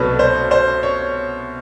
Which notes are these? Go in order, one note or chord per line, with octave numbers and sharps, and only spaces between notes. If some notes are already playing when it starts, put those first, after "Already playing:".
Already playing: C2 B2 F#3 A3 B4 C#5
C5
C5
C#5